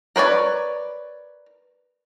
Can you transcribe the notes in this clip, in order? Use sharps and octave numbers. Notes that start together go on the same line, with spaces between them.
A#4 B4 C#5 D5